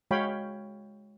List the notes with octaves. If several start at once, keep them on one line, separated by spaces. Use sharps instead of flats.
G#3 F#4 C#5 F5 G5 B5